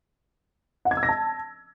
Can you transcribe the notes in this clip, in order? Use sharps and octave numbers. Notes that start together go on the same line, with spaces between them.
F#5
G#6
E6
A#6
A5